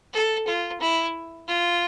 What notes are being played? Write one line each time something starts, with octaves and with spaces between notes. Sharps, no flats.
A4
F4
E4
F4